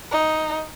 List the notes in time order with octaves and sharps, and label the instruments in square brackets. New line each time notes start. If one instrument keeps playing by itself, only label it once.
[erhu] D#4